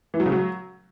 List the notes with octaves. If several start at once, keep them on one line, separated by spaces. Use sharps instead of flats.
E3
F#3
C#3
F#3